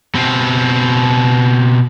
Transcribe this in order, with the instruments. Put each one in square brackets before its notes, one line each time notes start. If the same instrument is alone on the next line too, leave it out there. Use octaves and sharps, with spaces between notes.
[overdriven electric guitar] B2 C4